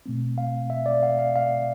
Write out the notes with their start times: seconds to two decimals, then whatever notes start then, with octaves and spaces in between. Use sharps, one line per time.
0.06 B2 A3 C4
0.38 F5
0.70 E5
0.86 D5
1.03 F5
1.19 F5
1.36 F5